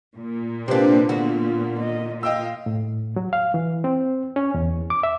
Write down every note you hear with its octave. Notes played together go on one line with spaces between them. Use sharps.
A#2
C3 A#3 C4 D4 B4 D5
D3 B3 F4 F#4
D#5
D#5 F5 G5 E6
A2
F#3
F5
E3
C4
C#4
E2
D6
E5